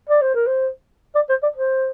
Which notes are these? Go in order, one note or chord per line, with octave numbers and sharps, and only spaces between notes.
D5
C5
A#4
C5
D5
C5
D5
C5